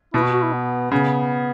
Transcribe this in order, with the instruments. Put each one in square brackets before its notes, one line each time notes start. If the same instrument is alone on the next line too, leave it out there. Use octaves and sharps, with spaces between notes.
[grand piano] B2 [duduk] E4
[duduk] F#4
F#4
E4
B3
[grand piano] C#3 [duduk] B3